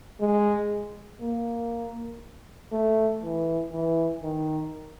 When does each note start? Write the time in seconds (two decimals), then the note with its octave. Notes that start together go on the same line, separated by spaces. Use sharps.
0.21 G#3
1.21 A#3
2.72 A3
3.23 E3
3.73 E3
4.23 D#3